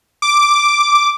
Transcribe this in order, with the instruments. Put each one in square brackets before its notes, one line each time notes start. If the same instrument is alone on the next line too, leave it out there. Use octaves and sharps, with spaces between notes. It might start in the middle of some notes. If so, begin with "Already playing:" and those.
[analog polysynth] D6